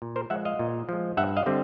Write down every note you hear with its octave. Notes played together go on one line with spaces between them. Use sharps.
A#2
A#4 C5
F3 G#3 E5 F#5
D#5 F5
A#2
F3 G#3
G2 E5 F#5
D#5 F5
D3 G3 C4